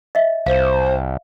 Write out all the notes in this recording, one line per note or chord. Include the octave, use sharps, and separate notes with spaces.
D#5 E5
C2 C5 F5